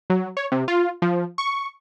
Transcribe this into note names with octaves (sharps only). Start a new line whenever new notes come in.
F#3
C#5
C3
F4
F3
C#6